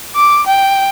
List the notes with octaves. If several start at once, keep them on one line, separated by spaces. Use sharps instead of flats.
D6
G5